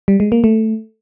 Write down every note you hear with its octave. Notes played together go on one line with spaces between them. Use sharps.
G3
G#3
A#3
A3